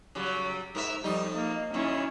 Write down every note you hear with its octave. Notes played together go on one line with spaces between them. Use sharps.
C#3 F#3 G3
G#2 A#4 E5
F2 G3 D#4
A#3
F#2 A#2 D#3 C#4 E4